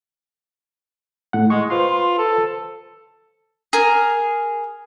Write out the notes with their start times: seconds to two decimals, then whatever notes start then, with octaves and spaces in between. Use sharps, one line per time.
1.33 A2 F#5
1.50 G#3 C#6
1.70 F4 B4 C5 C6
2.18 A4
3.73 G#4 A#4